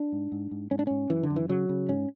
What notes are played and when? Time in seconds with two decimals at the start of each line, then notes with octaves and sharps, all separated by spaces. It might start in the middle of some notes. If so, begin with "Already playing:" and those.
Already playing: D4
0.12 G#2
0.32 G#2
0.51 G#2
0.71 G#2 C#4
0.79 D4
0.87 G#2 C#4
1.10 F#2 E3
1.23 D3
1.30 F#2
1.36 E3
1.49 C#3 F#3
1.69 C#3
1.89 G#2 C#4